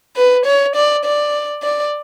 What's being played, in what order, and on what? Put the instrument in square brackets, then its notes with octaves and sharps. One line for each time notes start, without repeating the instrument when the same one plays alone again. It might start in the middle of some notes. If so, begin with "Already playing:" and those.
[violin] B4
C#5
D5
D5
D5